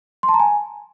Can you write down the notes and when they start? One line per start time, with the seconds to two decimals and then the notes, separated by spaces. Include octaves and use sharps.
0.23 C6
0.29 A5
0.34 A#5
0.40 G#5